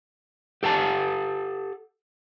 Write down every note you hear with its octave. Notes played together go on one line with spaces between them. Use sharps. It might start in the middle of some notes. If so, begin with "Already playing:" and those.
G4 A4 F#5 A5